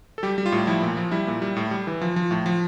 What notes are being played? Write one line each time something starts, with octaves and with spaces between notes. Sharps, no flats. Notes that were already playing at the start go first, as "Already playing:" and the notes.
A4
G3 G4
G3
F4
A2
F3 E4
A#2
F3
G3 E4
A#2
G3
A2
G3
E3
F3
F3
A2
F3